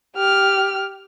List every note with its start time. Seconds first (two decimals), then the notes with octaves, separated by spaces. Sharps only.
0.16 G4 F6